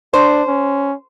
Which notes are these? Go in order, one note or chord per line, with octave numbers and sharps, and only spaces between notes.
D4 C5
C#4